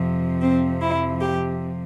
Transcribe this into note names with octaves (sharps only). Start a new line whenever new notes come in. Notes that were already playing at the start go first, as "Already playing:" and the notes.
Already playing: F2 C3 F3
C4
E4
G4